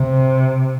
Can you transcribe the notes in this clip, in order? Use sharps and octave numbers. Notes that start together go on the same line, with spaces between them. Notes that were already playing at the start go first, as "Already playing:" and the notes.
Already playing: C3